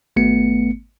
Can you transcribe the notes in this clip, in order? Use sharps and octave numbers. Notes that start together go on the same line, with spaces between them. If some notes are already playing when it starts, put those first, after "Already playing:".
G#1 A3 B3 C#7